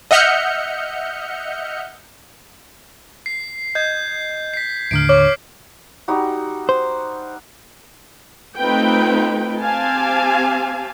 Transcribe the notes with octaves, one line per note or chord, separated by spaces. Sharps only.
D#5 E5 F#5 F6 G6 C#7
C7
D#5 G6 G#6
B6 C7
D#2 A2 D3 F6 C7 D7
C#5 D6 F6
G3 D#4 F#4
C5
A3 C4 D#4 F4 B4 G5
C4 G4 F5 G#5 A5